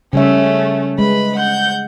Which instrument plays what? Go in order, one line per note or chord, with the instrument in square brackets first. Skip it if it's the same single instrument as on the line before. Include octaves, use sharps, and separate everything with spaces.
[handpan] C#3 G3 E5 [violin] A3 C#4
[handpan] G#3 [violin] B4 B5
[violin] F#5 G6